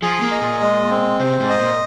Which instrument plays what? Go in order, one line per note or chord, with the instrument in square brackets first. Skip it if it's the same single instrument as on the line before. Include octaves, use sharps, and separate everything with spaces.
[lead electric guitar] F3 [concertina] G#4
[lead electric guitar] A#3
[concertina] D#5
[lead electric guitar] A#2
[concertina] G#3
C4
[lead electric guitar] C3 [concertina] C5
[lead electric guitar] G#2
[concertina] D#5
[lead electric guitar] A#2